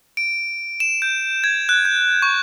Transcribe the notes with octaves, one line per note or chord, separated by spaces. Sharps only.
D7
E7
G6
G#6
F#6
G6
C#6